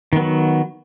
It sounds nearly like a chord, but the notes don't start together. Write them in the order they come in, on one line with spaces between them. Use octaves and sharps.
D#3 B3 F#3